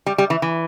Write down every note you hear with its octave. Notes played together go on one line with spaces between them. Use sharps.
G3
G3
E3
E3